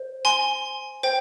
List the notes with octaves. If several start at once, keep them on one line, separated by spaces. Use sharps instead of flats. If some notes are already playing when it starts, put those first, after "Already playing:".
Already playing: C5
G#5 C6
C5 G5